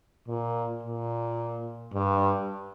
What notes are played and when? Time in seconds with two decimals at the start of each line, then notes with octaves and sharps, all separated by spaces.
0.28 A#2
0.83 A#2
1.93 G2